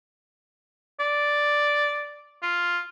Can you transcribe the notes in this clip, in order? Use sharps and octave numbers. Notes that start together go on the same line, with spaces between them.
D5
F4